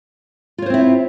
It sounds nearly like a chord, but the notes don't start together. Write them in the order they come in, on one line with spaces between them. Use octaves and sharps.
F4 C#5 C5 C4 E4